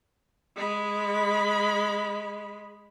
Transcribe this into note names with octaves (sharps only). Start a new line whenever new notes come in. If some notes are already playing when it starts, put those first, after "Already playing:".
G#3 B5